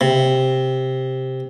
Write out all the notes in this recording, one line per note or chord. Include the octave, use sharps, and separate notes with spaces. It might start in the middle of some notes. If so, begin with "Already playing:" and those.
C3